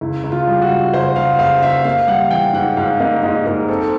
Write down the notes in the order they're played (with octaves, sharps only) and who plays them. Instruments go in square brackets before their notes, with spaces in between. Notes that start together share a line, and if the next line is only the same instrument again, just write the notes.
[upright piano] C#2 [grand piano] E4
[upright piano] C#2
[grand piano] F4
[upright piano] G3
[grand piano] F#4
[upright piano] C#2
[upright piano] C#2 [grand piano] C5
[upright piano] C#2 [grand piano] F5
[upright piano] C#2 [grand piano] F5
[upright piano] C#2 [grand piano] E5
[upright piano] A#3 [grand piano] F5
[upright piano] G3 [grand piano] F#5
[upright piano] E3 [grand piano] G5
[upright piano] G#2 [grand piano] F#5
[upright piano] G#2 [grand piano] F5
[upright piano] A#3 [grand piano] D#5
[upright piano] G#2 [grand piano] D#5
[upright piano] G#2 [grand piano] A#4
[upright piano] C4 [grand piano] A4